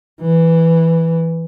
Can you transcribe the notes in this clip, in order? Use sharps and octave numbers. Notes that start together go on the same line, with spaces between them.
E3